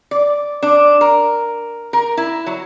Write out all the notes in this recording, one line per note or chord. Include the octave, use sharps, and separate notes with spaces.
D5
D4
A#4
A#4
E4
F#3